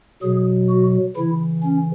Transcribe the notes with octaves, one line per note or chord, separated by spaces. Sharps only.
B2 F#3 G#4
F#4
C#3 E3 E4
C#4